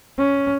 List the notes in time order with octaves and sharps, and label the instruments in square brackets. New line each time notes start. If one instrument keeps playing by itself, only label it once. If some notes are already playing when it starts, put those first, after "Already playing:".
[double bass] C#4